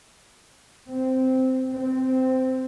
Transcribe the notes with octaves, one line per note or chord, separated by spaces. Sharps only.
C4
C4